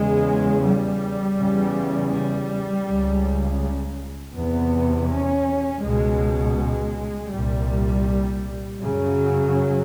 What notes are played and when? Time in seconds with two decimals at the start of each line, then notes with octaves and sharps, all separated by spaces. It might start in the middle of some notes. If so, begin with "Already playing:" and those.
Already playing: E2 C#3 G#3
0.64 G3
1.37 E2 C#3
2.12 G3
2.86 C#2 C#3
4.35 E2 C3 B3
5.10 C#4
5.83 C#2 B2 G#3
6.58 G#3
7.32 C2 A#2 G3
8.80 F#2 C#3 F#3